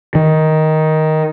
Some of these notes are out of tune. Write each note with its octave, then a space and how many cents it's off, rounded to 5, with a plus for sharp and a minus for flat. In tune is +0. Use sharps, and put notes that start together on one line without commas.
D#3 +10